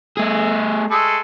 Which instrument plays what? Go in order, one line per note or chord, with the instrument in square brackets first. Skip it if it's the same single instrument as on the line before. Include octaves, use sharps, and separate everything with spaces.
[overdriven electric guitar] A3 G#4
[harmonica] G#3 A3 A4